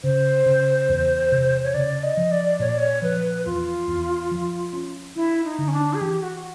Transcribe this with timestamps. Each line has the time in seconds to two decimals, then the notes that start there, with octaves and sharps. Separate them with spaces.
0.04 C#3 C5
0.46 C#3
0.89 E2
1.32 C3
1.64 C#5
1.74 C#3 D5
2.03 D#5
2.17 F3
2.31 D5
2.59 A#2 C#5
2.69 D5
2.79 C#5
3.02 F3 B4
3.46 E2 F4
3.88 E2
4.31 F3
4.73 C#4
5.16 D4 E4
5.45 D#4
5.58 D3
5.68 C#4
5.73 D4
5.94 G#4
6.01 E3 G4
6.23 F#4